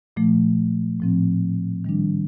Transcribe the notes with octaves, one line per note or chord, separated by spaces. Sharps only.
A#2 F3 A3
A2 F3 C4
D#3 G3 D4